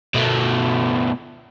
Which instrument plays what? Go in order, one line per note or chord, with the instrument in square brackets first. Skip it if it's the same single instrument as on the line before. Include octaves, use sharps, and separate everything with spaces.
[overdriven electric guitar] B2 A3